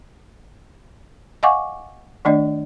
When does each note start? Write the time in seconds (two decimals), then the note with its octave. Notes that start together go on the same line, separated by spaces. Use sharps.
1.43 D#5 F5 F#5 G#5 C#6 D6
2.25 D#3 A3 D4 D5 D#5